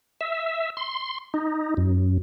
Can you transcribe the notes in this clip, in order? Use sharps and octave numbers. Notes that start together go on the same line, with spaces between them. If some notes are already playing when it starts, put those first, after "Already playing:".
E5
C6
D#4
F#2